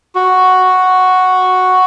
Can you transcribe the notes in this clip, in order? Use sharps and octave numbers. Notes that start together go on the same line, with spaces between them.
F#4